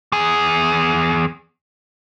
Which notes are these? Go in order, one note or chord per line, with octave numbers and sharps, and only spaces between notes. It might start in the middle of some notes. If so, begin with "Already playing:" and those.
E2 G#4